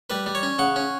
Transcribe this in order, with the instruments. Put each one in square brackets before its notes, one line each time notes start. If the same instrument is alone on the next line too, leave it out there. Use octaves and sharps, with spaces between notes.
[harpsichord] G3 B4
G3
C#5
C#4
C#3 F#5
C#4